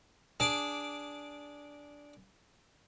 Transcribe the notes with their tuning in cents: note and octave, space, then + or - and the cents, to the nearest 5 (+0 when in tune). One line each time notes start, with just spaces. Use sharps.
D4 -10 G#4 +0 D6 +0